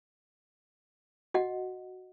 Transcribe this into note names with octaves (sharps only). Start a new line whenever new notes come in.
F#4 D#5 F#5